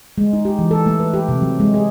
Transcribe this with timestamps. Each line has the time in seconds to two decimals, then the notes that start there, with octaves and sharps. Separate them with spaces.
0.18 G#3
0.33 D#4
0.45 G4
0.59 E3
0.71 A4
0.86 A3
1.00 B4
1.14 G4
1.29 C3
1.42 F#3
1.60 G#3
1.74 G#4